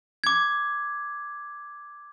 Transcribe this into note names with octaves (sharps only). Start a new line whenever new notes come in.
D6 G#6